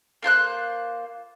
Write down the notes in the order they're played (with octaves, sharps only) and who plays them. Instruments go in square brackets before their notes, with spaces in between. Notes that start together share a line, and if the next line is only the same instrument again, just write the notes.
[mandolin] A#3 F4 C5 F#6